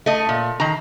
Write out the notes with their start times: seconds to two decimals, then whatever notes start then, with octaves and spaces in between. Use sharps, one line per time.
0.06 A3 D#5
0.29 A#2
0.60 D#3 A#5